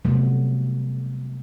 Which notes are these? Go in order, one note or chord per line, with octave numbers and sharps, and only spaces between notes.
C3 F#3 G3 A3 B3